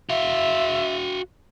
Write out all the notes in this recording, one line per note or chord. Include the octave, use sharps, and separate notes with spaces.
F#4 E5 F5